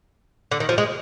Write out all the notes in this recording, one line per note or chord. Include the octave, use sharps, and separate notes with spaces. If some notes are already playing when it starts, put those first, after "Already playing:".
D3
D#3
F3
G#3